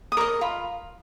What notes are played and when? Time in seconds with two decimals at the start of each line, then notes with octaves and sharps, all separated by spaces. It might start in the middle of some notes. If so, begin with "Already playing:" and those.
0.12 D#6
0.17 A#4 D6
0.21 D#5
0.41 F4 B5